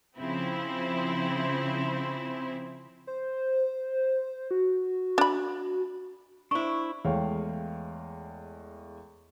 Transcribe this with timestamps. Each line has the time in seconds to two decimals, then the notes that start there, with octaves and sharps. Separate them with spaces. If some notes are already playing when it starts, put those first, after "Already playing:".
0.18 C#3 F3 C4 E4
3.07 C5
4.51 F#4
5.18 D4 B5
6.51 D4 E4 C5 C#6
7.05 E2 G#3 A3 C#5 F5 G5